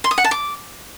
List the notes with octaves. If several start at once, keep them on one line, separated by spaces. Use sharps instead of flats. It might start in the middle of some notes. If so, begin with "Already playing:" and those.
C6
D#6
F#5
A5
D6